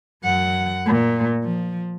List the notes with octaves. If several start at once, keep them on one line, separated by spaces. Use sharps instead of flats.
F#2 F#5
A#2
F3